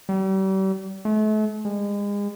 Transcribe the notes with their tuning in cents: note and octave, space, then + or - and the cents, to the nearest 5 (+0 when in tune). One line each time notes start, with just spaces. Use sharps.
G3 -40
A3 -40
G#3 -35